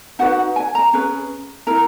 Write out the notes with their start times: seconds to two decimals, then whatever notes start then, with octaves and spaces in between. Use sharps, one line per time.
0.19 D#4 F#4 B4 F#5
0.56 G#5
0.75 A#5
0.93 C#4 G#4 B4
1.67 E4 A#4 A#5